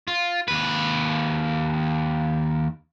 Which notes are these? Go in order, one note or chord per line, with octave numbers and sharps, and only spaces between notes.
F4
D#2 B4